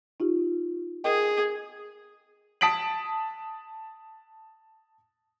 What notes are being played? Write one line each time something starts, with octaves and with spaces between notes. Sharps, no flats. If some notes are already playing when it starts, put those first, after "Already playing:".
D#4 F4 G4
G#4 A#4 D#5 G5
A5 D#6 B6 D7 F#7